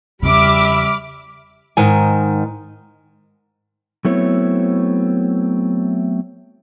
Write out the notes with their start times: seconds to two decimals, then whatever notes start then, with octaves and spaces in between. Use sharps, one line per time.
0.23 E2 C#3 G3 E5 B5 D6 F6
1.77 G#2 D#3 G#5
4.05 F#3 A3 B3 C4 E4 C#5